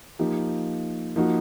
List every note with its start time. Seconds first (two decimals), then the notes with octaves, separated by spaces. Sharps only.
0.19 F3 A#3 D#4 G4
1.16 F3 A#3 D#4 F#4